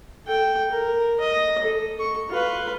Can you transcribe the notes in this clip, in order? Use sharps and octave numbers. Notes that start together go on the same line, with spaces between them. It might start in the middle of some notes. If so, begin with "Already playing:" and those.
A4 G5
A#4
D#5
A4
A4 C#6
F4 B4